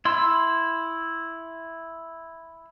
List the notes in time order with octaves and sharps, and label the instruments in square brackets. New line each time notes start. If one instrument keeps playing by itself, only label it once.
[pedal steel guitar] E4 C6 E6